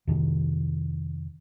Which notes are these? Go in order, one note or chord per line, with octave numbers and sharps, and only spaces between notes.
F2 C3 D#3